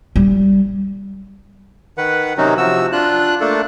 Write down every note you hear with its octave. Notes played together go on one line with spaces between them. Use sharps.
G3
D#3 B4 F#5
C3 D#3 F#3 C#4 D#4 F#4
C3 F3 F#4 E6
D4 F4 F#6
A3 A#3 D4 A4